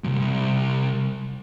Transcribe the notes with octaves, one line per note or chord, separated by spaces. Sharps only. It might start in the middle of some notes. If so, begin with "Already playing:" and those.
C2 F#2